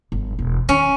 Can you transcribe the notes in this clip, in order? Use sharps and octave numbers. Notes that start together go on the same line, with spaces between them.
G1
E1
D#3 C#4